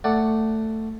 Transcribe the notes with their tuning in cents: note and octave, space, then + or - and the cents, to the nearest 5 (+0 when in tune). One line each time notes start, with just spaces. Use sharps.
A3 +10 D5 +0 F#5 +5